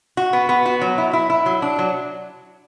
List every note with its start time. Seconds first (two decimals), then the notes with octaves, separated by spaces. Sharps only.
0.17 F#4
0.33 B3
0.49 B3
0.66 F#4
0.82 F#3
0.98 E4
1.13 E4
1.30 E4
1.46 F#3
1.62 D4
1.79 F#3